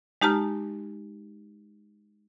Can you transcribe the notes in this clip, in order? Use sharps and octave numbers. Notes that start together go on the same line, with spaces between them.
G#3 D#4 G4 A5 A#5 F6